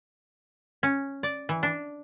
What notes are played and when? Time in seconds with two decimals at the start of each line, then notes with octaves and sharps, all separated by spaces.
0.83 C#4
1.23 D5
1.49 E3
1.63 D4